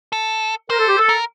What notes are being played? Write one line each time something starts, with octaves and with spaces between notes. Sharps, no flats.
A4
A#4 C5
A4
G4
A4
A#4